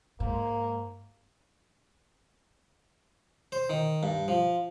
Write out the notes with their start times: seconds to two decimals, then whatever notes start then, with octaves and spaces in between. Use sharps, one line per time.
0.20 G#2 A#3
3.52 C5
3.70 D#3
4.03 G2
4.28 F3